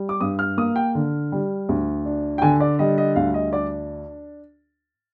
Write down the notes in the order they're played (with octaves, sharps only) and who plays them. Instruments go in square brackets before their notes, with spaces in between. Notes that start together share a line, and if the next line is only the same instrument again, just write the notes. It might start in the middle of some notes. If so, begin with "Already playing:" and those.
Already playing: [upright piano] G3
D6
G2 D#6
F6
A#3 D#6
G5
D3
G3
D2
D4
G5
D3 G#5
D5
G3 D#5
D#5
D2 F5
D#5
D4 D5